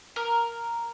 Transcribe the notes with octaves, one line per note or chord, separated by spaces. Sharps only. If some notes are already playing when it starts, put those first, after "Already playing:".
A#4